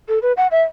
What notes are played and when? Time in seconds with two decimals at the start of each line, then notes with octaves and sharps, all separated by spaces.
0.08 A4
0.22 B4
0.37 F#5
0.51 E5